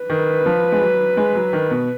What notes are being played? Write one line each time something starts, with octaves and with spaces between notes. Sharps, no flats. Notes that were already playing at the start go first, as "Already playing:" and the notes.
Already playing: B4
D#3
F3
G#3
F#3
G#3
F#3
D#3
B2